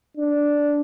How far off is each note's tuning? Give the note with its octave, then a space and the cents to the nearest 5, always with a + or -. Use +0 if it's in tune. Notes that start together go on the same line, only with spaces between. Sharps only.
D4 -5